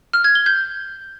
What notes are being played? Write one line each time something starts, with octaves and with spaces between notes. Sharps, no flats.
F6
G#6
G7
G6